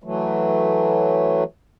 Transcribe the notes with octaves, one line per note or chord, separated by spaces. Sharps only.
E3 F#3 A3